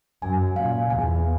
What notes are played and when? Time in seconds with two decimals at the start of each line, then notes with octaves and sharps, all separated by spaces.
0.22 F#2 G#5
0.56 A#2 F5
0.90 E2 G#5